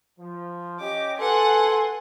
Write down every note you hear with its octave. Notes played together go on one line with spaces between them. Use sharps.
F3
C#4 G4 D#5 D6
A4 B4 F#5 G#5 C6